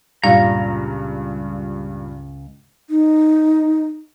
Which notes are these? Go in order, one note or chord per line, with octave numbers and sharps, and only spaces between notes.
C#2 G2 A#2 F5 A#5
D#4